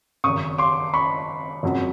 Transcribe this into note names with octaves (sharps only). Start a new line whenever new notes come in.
G#1 F#2 C#3 C#6 D#6
C6 D6
B5 C#6
F#1 F2 C#3 F#3